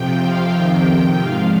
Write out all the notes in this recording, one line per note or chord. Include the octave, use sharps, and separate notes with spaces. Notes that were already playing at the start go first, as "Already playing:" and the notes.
Already playing: F2 C3 F3 G5
F5
F2 C3 D#3 G5
G5
G#2 F3 F5